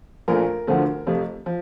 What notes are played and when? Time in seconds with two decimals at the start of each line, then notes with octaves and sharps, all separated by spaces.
0.28 A#1 A#2 A3 A#4
0.67 D2 D3 F3 A3
1.07 F2 C3 F3 A3
1.46 F3